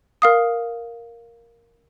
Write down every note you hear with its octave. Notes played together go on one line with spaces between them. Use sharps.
A#4 F5 D#6